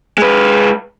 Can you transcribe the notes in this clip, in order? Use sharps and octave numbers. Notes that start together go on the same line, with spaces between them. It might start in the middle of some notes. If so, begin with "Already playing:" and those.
G#3 B4